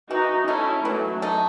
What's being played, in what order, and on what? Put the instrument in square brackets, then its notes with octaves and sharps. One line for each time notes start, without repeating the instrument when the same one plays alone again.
[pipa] E3 [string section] D#4 F#4
[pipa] A3 D#4 [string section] C#4 E4
[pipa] E3 [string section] F#3 A3
[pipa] A3 D#4